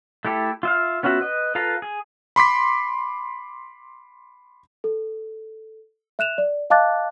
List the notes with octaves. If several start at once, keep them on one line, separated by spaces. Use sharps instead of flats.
A3 E4 G4 A4
F4 E5 F5
B3 C#4 F4 F#4 E5
B4 D#5
F4 A4 B4 F5 A#5
G#4
B5 C6 D6 B6
A4
E5 F#6 E7 F7
D5
D#5 F5 A5 D6 F#6 A6